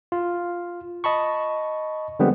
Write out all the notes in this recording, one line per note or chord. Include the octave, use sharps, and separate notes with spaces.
F4
D#5 A5 B5 C#6
D3 F3 G3 G#3 B3 C4